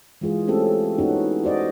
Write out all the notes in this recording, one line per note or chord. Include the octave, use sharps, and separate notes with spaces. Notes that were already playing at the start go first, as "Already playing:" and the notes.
E3 G#3 F4 G#4
A3 C4 C#4 G4 A4
B3 C#4 D#4 E4 F#4
F#4 C5 D5 D#5